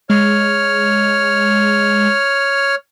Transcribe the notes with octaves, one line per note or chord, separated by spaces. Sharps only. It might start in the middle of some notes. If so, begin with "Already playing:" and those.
G#3 C#5 F6